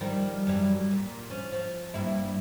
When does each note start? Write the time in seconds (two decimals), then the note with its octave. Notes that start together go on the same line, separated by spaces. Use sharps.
0.01 D#3 F3 G3
0.47 F#2 E3 G3
0.91 A#2
1.30 F3 C#4
1.52 F3
1.94 G2 A#3 E4